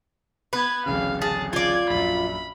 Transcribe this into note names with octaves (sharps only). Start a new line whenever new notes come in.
B3 B4 G#6
D1 A1 C#3 F5
G#4 A5
F4 D5 G#6
A#1 F#2 B5